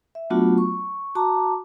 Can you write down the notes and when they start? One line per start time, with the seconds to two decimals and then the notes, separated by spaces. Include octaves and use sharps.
0.15 E5
0.30 F#3 A3 B3 D4 F4 F#4
0.58 C#6
1.15 F#4 A5 A#5 D6